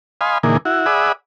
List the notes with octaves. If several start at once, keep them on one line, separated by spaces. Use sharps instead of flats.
D#5 F5 G#5 B5 C6
A#2 D3 E3 A#3 D#4 G#4
E4 F#4
G#4 D5 E5 F#5 B5 D#6